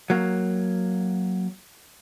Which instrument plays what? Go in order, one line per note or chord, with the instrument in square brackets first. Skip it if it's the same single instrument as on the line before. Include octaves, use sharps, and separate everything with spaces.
[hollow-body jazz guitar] F#3 A#3